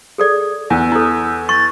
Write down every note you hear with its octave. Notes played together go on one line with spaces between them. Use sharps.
G#4 A4 D5
E2 E6
E4 A4
C#6 A6